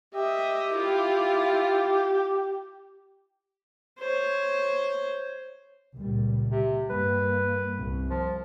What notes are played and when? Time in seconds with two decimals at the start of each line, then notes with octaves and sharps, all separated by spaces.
0.15 G4 D#5 E5
0.74 E4 F4
4.00 C5 C#5
5.95 C#2 A#2 G3
6.51 C3
6.90 G2 G3 A#3 B4
7.77 C2
8.10 F3